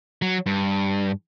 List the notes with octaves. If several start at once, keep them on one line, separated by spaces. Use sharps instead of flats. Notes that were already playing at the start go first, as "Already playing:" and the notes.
F#3
G2